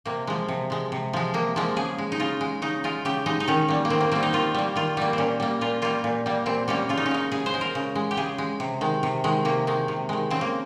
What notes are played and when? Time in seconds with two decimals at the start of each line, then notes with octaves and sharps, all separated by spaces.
0.06 C3 A#3
0.27 F3 G#3
0.48 C3
0.70 F3 G#3
0.92 C3
1.13 F3 G#3
1.34 C3 A#3
1.56 F3 G#3 A#3
1.76 C#3 G#4
1.98 G#3
2.12 D#4
2.20 C#3 F4
2.41 G#3
2.62 C#3 D#4
2.84 G#3 F4
3.05 C#3 G4
3.26 G#3 D#4
3.40 D#4
3.48 D#3 C#4
3.68 G3 A#3
3.85 A#3
3.90 D#3 C4
4.00 A#3
4.12 G3 A#3 C4
4.23 D#4
4.33 D#3 F4
4.54 G3 A#3
4.76 D#3 F4
4.97 G3 A#3
5.13 A#2 C4 C#4
5.40 G3 A#3
5.61 A#2 F4
5.82 G3 A#3 F4
6.04 A#2
6.26 G3 A#3
6.46 A#2 C4
6.68 G3 A#3 C#4
6.89 C#3 F4
6.97 D#4
7.06 C#4
7.11 G#3 D#4
7.32 C#3 G#4
7.46 C5
7.54 G#3
7.61 A#4
7.75 C#3
7.95 G#3
8.11 G4
8.17 C#3 G#4
8.38 G#3
8.60 C3
8.81 D#3 G#3
9.03 C3
9.24 D#3 G#3
9.45 C3 A#3
9.67 D#3 G#3
9.88 C3
10.09 D#3 G#3
10.30 C#3 C4
10.41 A#3